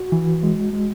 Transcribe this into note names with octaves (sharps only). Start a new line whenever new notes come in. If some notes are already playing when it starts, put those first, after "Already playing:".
Already playing: F#4
E3
G#3
G#3